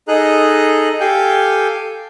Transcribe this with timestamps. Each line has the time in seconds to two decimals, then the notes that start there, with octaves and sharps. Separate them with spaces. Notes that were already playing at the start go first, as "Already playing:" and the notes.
0.08 D#4 G#4 A4 D#5 A#5 F#6
1.00 G4 A4 F5 G5 G#5 G6